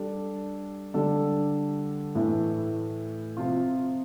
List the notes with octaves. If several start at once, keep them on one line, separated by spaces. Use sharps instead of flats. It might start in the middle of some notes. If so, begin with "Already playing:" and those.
Already playing: G3 D4 A4
D3 G3 D4 A4
A2 E3 A3 E4
C3 F3 C4 F4